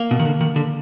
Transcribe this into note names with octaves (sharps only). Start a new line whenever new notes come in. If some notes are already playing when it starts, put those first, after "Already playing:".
Already playing: A#3
B2
D#3
D3
D#3
D3